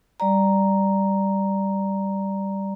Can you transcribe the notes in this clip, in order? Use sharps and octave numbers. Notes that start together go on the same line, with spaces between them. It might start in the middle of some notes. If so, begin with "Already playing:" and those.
G3 D5 A#5